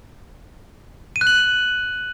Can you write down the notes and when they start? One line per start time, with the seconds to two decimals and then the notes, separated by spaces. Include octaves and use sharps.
1.16 D#7
1.21 F#6
1.27 F#7